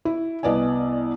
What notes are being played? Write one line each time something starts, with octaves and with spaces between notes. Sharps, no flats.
E4
C2 B3 D5 D#5 G#5